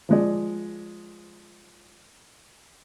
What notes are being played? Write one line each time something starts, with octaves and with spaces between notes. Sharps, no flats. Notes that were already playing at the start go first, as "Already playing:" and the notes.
F3 G#3 D5